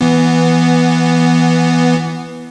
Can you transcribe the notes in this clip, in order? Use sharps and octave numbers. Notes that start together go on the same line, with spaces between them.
E3 B3